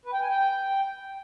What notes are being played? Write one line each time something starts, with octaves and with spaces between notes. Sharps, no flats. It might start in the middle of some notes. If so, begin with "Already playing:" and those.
B4
G5
G#5
G5